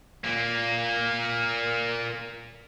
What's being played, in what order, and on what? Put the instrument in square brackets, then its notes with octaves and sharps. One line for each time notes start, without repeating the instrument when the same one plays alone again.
[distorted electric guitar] A#2 A#3